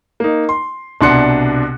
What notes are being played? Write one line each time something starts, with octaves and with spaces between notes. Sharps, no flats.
A#3 D#4
C6
C2 B2 D4 C6 F#6 C#7